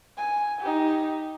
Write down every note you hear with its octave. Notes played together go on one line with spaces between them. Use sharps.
G#5
D#4 G4